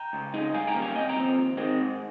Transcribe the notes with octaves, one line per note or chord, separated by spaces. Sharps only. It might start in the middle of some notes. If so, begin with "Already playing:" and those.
Already playing: G5 A#5
C#2
C#3 G#3 D#4
G2 F5 G#5
G5 A#5
D#3 G3 A#3 C#4
F5 G#5
C3 D#5 G5
G5 A#5
F3 C4
D#2
D#3 G#3 C4
G#2